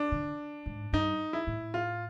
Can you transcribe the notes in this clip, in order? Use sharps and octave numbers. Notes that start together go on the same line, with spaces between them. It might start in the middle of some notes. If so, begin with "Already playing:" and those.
Already playing: D4
D3
G#2
G2 D#4
E4
A2
F4